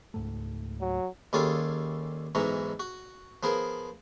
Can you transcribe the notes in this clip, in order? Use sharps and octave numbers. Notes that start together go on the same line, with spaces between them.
C#2 G#2 A3
F#3
D#2 G3 C#4 F4 G#4 A4
B1 G#2 E3 D#4 A#5 C#6
F#4
F3 B3 G#4 A#4